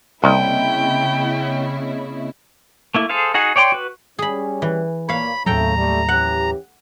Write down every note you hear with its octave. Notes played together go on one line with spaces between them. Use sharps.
C2 C#3 A#3 C4 E4 D#5 G5
A3 A#3 E4
G#4 A4 C5 F5
D#4 F#4 G#4 F#5
C#5 D5 G5 A#5 C6
F#4 B4
G3 C#4 G#4 B5
E3
A#2 A#3 C#5 F5 B5
D#2 A2 C#3 F#3 A3 A4 G5 A#5
G3 A3
E3 C#4 G4 F#5